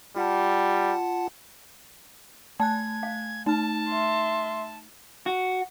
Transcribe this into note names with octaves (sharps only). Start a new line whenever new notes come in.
G3 F4 F#5 A5
A3 G#5 A5 F#6 G#6
F5
A3 D#4 A5 F6
E5 C6
F#4